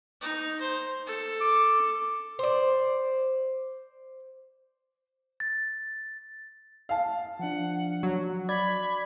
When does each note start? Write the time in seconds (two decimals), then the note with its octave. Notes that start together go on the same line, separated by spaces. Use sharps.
0.21 D#4
0.61 C5
1.07 A4
1.41 D6
2.39 C5 D5
5.40 A6
6.89 F5 A5
7.39 F3 D4 F#5
8.03 F#3
8.49 D5 B5 G#6